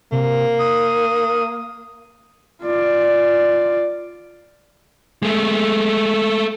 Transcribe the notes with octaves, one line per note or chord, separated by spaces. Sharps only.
C3 A#3
D#6
F4 D5
G#3 A3